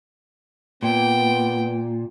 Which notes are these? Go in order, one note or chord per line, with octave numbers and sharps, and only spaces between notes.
A#2 B3 G5